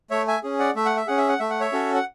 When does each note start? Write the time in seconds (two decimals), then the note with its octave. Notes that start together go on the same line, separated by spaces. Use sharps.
0.11 A3 C#5 E5
0.28 E5 G#5
0.43 C#4 G#4
0.59 D5 F#5
0.76 A3 E5
0.86 F#5
0.96 E5
1.07 C#4 G#4 F#5
1.18 E5
1.29 F#5
1.40 A3 E5
1.50 F#5
1.60 C#5 E5
1.72 C#4 F#4 A4
1.95 F#5